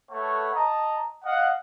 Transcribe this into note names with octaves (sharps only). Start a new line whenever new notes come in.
A3 A4 B4 C#5 F#5
D#5 A5 A#5
D#5 F5 F#5